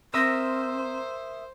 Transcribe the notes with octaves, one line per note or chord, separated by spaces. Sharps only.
C4 A#4 C5 E5 D#6 E6